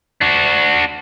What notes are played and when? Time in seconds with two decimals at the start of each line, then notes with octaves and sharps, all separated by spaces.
0.21 D4 F#4